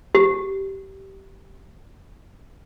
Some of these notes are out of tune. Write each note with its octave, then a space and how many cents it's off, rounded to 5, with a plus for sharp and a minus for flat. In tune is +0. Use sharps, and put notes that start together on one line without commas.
G4 -20